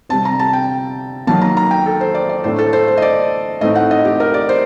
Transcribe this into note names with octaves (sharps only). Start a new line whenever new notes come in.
C3 G3 C4 A5
A#5
A5
G5
D#3 F#3 A#3 A5
A#5
A#5
G5
A4
C5
D5
D5
A2 A3 D4 C5
A4
C5
C5
D#5
D5
A2 A3 C4 D#4 D#5
F#5
D#5
G4
A#4
D5
C5